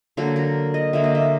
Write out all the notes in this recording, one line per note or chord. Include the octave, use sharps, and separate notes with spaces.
D3 F#3 A#3 A4
A#4
D#5
D3 F#3 A#3 E5
D#5
E5